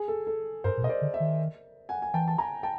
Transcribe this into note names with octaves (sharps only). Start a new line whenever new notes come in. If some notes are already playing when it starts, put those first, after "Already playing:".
Already playing: G#4
A4
A4
G2 A#4 C5
A#2
B2 D#5
C5 D5
D3
D5 E5
D#3
F#5 G#5
G#5
E3 G5 A5
A5
G#5 A#5
G5 A5